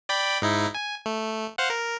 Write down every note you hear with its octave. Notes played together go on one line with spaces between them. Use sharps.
D5 G5 B5
G#2 D#4 E4
G#5
A3
C5 F5 F#5
A#4